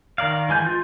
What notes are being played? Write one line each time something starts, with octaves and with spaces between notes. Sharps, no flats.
D#3 A#4 D5 F5
E3 G#3 G#5 G6
F4